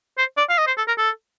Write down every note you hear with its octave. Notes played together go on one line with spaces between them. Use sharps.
C5
D5
F5
D#5
C5
A4
A#4
A4